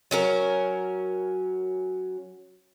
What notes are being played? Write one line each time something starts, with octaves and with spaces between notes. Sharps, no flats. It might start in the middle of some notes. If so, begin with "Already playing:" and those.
F#3 C#4 A#4